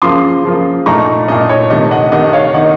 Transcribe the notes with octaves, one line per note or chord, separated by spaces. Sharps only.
C#3 F3 A#3 F4 C6 D#6
C#3 F3 A#3 F4
A#2 A3 D#4 A#5 C#6
A#2 A3 D#4 D#5
C#5
C3 D#3 A3 D#5
D#5 F#5
C3 D#3 A3 D#5 F#5
C#5 F5
D#3 A#3 D#4 D#5 F#5